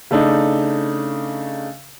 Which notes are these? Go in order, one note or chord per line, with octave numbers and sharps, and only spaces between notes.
C#3 A3 D4 D#4